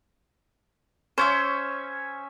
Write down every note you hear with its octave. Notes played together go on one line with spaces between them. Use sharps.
C#4 C5 C#5 E5